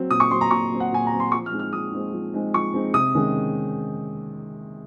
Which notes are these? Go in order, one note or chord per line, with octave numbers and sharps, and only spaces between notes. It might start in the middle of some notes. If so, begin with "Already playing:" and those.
Already playing: F#3 C4
A#2 D#6
C#6
F#3 C4 C6
A#5
A#2 C#6
F#3 C4
F#5
A#2 G#5
A#5
F#3 C4
C6
F3 C#6
F6
G#3 C4 D#4
F6
F3 D#6
G#3 C4 D#4
F3
G#3 C4 D#4
F3 C#6
G#3 C4 D#4
C3 D#6
D#3 G#3 C#4